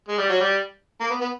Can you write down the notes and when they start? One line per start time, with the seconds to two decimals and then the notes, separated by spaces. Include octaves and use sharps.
0.08 G#3
0.18 G3
0.29 F#3
0.41 G3
1.01 A#3
1.10 B3
1.21 B3